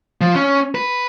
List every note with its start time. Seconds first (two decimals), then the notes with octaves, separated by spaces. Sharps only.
0.21 F3
0.35 C#4
0.75 B4